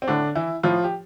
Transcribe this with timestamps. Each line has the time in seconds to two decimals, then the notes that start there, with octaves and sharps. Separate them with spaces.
0.02 C4
0.08 A2 D3 D4
0.35 E3 E4
0.63 A2 F3 F4
0.84 G4